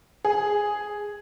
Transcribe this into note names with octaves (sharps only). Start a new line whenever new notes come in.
G#4